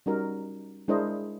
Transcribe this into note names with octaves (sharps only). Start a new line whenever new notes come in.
G3 C#4 D#4 F#4 A#4
G#3 D4 E4 A#4 C5 D#5